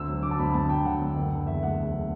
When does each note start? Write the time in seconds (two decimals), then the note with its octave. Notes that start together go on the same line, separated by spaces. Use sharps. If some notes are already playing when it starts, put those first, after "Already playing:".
Already playing: D2 E6
0.08 F#3
0.23 D3 D6
0.31 A5
0.39 D2 B5
0.54 D2 A5
0.69 F#3 G5
0.85 D3 F#5
1.01 D2
1.17 F#1
1.32 D3
1.47 E2 E5
1.62 A3 F#5
1.78 F#1
1.93 D3